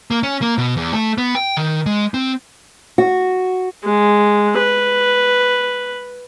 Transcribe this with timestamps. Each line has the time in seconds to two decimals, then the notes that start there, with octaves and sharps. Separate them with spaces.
0.11 A#3
0.23 C#4
0.42 A#3
0.58 B2
0.77 E2
0.93 A3
1.18 B3
1.35 G5
1.57 D#3
1.86 G#3
2.14 C4
2.98 F#4
3.85 G#3
4.58 B4